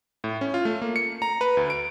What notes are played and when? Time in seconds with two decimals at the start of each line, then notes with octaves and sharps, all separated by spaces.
0.24 A2
0.41 C#4
0.54 F4
0.65 A3
0.82 A#3
0.96 C#7
1.22 A#5
1.41 B4
1.57 D2
1.70 D7